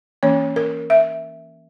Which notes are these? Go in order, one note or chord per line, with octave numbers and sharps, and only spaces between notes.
E3 A#3 C#4 C#5
A#4
E5